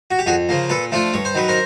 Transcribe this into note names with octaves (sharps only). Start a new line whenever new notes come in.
F#4
G4
F2 F#4 G#4
C#3 F3 A#3
A#2 A4 B4
F3 A3 D4 F4
G2 C#5
C5
D#3 F#3 B4
A#4 C5